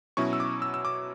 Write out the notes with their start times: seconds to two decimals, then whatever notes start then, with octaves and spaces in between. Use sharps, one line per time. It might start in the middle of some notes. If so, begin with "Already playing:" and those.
0.17 B2 F#3 C#4 E4 C#6
0.33 E6
0.40 D6
0.62 E6
0.74 E6
0.85 D6